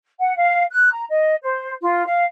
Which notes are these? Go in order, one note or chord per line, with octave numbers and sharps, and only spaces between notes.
F#5
F5
F#6
A#5
D#5
C5
F4
F5